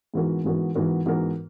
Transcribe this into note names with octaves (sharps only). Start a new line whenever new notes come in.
G#2 E3 B3 F#4 A#4
G#2 E3 B3 F#4 A#4
G#2 E3 B3 F#4 A#4
G#2 E3 B3 F#4 A#4